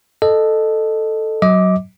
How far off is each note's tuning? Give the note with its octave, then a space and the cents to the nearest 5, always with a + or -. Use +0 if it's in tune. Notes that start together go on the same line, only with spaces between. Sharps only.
A4 +0 D#5 -20
F#3 +15 D#5 +30 D6 +0